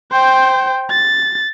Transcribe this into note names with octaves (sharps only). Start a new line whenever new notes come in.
C5 G5
A6